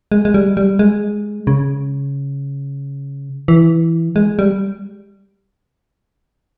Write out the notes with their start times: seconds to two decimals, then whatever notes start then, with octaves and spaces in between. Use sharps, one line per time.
0.12 G#3
0.25 G#3
0.34 G3
0.57 G3
0.79 G#3
1.47 C#3
3.48 E3
4.16 G#3
4.39 G3